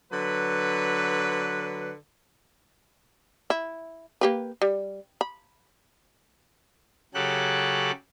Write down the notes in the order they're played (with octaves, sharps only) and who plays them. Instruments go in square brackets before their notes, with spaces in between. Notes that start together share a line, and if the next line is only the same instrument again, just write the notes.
[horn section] D3 F#3 B4
[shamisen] E4
A#3 G4 B4
G3
B5
[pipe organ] C#3 F#3 G4 A4 F#6